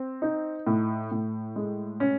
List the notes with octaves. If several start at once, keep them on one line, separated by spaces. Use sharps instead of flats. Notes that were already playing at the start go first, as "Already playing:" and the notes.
Already playing: C4
D#4
A2
A2
G#3
C#4